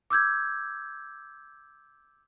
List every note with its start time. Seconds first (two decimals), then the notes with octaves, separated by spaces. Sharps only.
0.10 D6 E6 G6 G#6